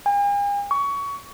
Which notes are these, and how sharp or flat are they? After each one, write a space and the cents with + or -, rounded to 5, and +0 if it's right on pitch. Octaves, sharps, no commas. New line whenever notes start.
G#5 -45
C#6 +20